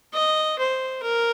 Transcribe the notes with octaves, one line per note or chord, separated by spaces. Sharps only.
D#5
C5
A#4